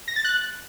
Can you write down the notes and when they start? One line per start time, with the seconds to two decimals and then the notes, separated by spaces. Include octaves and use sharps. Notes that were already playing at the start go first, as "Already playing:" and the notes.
0.08 A#6
0.16 A6
0.24 F#6